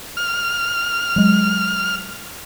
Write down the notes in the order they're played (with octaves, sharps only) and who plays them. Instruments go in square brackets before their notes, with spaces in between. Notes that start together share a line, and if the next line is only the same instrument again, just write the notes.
[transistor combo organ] F6
[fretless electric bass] F#3 G#3